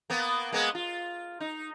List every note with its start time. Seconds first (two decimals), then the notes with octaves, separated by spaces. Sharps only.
0.10 A#3 B3
0.52 G#3 A#3 B3
0.75 F4
1.40 D#4